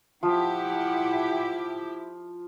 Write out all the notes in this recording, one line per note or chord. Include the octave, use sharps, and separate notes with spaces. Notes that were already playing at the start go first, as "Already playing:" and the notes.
F3 E4 G4 F#5